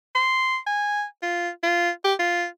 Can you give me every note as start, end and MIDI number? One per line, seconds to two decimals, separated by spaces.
0.15 0.58 84
0.66 1.04 80
1.23 1.49 65
1.63 1.90 65
2.04 2.14 67
2.19 2.46 65